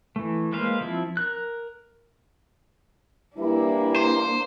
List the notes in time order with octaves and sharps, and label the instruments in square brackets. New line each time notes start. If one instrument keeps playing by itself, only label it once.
[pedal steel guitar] E3 A3
G#3 A#3 B4 C5 F5
F3 C4 E4
A#4 F#6
[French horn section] E3 G3 E4 [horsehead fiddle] A#3 D4
[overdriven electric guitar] C5